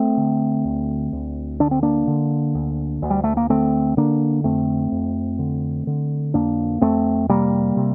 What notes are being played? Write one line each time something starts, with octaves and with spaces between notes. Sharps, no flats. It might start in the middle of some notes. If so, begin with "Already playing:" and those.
Already playing: A3 C4
D3
D2
D2
D3 D4
C4
A#3 D4
D3
D2
D2
G3
A3
A#3
D3 A3 C4
D3 A#3 D4
F2 A3 C4
F2
D3
D3
F2 A#3 D4
F2 A3 C4
C3 G3 A#3
C3